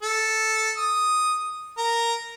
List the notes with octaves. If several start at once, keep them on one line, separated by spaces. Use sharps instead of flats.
A4
D#6
A#4